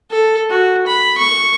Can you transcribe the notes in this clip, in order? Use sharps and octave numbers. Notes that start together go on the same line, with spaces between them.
A4
F#4
B5
C#6